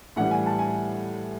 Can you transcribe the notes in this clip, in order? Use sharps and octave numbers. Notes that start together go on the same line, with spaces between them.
A2 E3 G3 F#5
G#5
A5
G#5